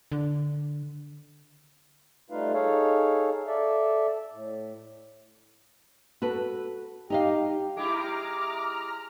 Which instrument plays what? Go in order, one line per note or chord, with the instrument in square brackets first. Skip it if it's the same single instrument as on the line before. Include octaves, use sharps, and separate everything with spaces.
[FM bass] D3
[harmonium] G3 A3 D#4 F4 B4 F5
D#4 G#4 A4 C#5 F5
A4 D5 E5
A2
[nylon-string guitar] F#4 A4 B4
[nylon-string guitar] D#4 D#5 F5 [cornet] G4
[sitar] G#3 E4 G4 [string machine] A#5 F6 [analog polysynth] D6